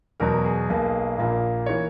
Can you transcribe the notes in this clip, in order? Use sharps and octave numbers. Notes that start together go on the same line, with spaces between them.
E2 B2 F#3 A#4
G#4
B1 B2 A#3
A#1 A#2 A#3
E3 A#3 C#5